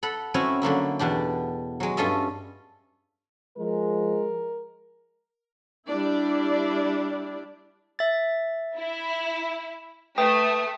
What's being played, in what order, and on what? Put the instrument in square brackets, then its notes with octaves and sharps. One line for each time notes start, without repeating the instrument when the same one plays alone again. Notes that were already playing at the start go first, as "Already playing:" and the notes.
[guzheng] A4 F#5 B5
C4 C#4 E4 F#4 C#5 G#5
D3 F#3 A#3 E4
E2 B2 D4 G4
F#3 G#3
G2 C#4 F4 A4 D#5 E5
[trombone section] F3 G#3 [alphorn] A#4
[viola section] G3 D4 E4 D5
[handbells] E5 A6
[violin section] E4
[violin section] A3 [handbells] B4 G5 D#6